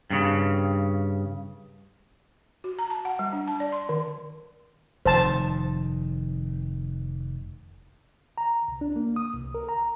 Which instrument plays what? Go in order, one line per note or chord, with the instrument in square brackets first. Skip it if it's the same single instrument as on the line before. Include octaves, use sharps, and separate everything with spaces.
[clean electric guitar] G2 C#3
[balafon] F#4
A#5
A5
F#5
G3
D4
A5
D5
C6
D#3
[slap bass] F1 D#3 [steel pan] C5 A5
[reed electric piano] A#5
C2
D4
A#3
D#6
C2
A#4
A#5